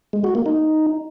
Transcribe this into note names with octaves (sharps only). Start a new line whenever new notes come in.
G#3
F#4
A#3
D#4